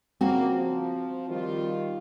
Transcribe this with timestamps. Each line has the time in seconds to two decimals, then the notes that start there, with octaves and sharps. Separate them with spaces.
0.21 C#3 F3 A#3 C4 F#4
0.55 F3
1.29 D#3 G3 F4